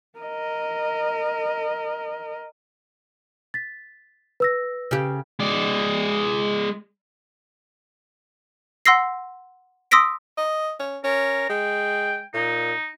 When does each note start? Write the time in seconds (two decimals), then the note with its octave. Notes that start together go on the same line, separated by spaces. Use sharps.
0.19 A#4 D#5
3.54 A6 B6
4.40 B4 E6 A#6
4.91 C#3 G4
5.40 G#3 D5
8.86 F#5 C6 E6 A#6 C7
9.91 C6 D#6 E6 A#6 B6 D7
10.38 D#5
10.80 C#4
11.04 C#4 A#4
11.49 G#3 G5
12.34 A#2 D#4